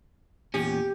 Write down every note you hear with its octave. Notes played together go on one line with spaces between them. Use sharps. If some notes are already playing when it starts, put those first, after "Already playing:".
E2 A#2 C#4 G4